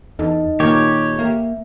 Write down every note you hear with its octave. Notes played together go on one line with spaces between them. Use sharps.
E2 D#4 A4 D#5
A#2 D#3 A#3 G4 C#5
A#3 E5